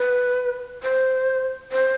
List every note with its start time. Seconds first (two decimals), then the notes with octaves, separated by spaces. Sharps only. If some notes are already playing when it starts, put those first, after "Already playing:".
Already playing: B4
0.83 C5
1.72 C5